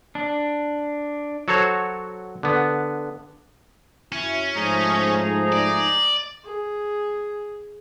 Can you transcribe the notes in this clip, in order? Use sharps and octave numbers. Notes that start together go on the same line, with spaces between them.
D4
F#3 F#4 A4 C5 C#5
D3 B3
F#2 C#4 E4
G#2 F3 A3 D#4 G#4 A#5
D5
G#4